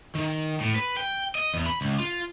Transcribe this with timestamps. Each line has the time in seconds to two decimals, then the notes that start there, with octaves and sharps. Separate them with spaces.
0.15 D#3
0.60 A2
0.75 B4
0.97 G5
1.35 D#5
1.54 E2
1.66 B5
1.81 C#2
2.00 F4